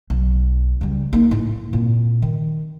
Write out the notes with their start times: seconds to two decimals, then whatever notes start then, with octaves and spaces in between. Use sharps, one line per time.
0.10 B1
0.81 C#2 G3
1.13 A#3 D#4
1.31 A2
1.73 A#2 C4
2.22 D#3